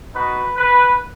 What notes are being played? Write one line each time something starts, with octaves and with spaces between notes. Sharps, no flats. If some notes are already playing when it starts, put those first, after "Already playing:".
B3 D#4 F#4 B4
B4